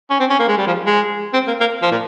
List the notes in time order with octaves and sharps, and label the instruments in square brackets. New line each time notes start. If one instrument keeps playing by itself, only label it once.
[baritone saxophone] C#4
C4
C#4
A#3
G#3
G3
F3
G#3
C4
A#3
A#3
F3
A#2